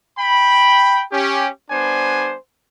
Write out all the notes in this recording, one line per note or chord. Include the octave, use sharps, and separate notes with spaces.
G5 B5
C#4 G4
G3 B3 D4 C5 G#5